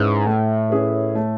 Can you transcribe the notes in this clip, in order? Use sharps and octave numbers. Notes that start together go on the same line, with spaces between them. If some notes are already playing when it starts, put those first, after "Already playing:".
Already playing: G#2 C#4 E4 G#4 B4
A2 A3
C#4 E4 G#4 B4
A3